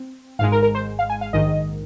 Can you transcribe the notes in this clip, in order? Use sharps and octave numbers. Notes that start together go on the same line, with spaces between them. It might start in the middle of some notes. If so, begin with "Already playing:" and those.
Already playing: C4
G#1 G#2 G#3 F5
A#4
A#4
C5
F5
G#5
F5
A#1 G#2 D#3 D#5